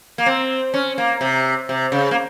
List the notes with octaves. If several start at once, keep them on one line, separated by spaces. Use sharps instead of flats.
A#3
C4
C#4
A#3
C3
C3
C#3
A#3